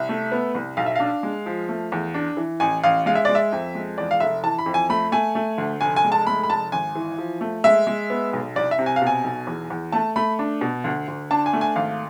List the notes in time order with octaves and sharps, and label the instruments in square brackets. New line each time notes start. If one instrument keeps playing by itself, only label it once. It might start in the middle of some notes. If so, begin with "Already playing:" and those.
Already playing: [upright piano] C2 E5
A3
B3
C2
B1 F5
E5
D4 F5
G#3
F3
A3
E2
D4
E3
A1 G#5
A1 F5
G#3 F5
E5
G#3 D5
E5
F2
G#3
E2 D5
F5
F1 E5
E3 A5
B5
F2
G#5
A3 B5
A3 G#5
A3
D2
F1 G#5
G#5
G#3
A5
A3 B5
B5
F1 A5
G#1 G#5
E3
F3
A3
G#3 E5
G#3
B3
B1
C2 D5
E5
C3
G#5
F5
B2
G#5
B1
E2
E2
A3 A5
A3 B5
D4
B2
D2
D2
D4 A5
G#5
A3
G#5
G#1 F5